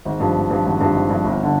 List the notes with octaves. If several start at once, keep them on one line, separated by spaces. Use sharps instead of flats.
G#1
G2 F3
G#1
G2 F3
G#1
G2 F3
G#1
G2 F3
G1
D3